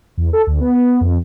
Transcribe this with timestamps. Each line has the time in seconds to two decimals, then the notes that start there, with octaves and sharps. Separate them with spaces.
0.17 E2
0.33 A4
0.47 D2
0.61 B3
1.01 F2